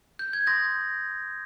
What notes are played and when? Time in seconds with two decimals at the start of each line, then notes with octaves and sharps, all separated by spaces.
0.19 G6
0.33 G#6
0.47 C6 D#6 G6 A#6